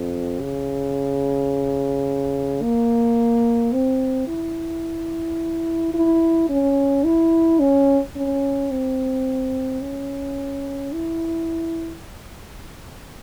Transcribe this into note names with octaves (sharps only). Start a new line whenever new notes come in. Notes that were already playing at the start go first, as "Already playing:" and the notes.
Already playing: F2
C#3
A#3
C4
E4
E4
C#4
E4
C#4
C#4
C4
C#4
E4